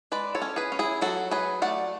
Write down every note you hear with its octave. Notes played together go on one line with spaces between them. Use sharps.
G#3 B4 D5
A4 C#5
C#4
G#4 B4
C#4
E4 G#4
F#3 F#4 A4
F#3 G#4 B4
A3 D5 F#5